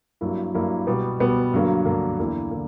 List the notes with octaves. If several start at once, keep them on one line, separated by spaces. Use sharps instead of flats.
G2 F#3 A#3 E4
G2 F#3 A#3 E4
B2 G3 B3
B2 G3 B3
G2 D3 F#3 A#3
G2 D3 F#3 A#3
E2 D3 A#3 E4
D3 A#3 E4